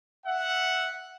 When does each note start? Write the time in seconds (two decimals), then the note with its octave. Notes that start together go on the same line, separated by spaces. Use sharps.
0.26 E5 F#5